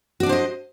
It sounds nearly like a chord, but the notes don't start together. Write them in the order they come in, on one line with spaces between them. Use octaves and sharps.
F#4 D5 D4 C5 D#5